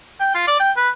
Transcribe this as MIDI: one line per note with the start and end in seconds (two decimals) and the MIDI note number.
0.20 0.32 79
0.35 0.43 65
0.48 0.59 74
0.60 0.71 79
0.77 0.90 71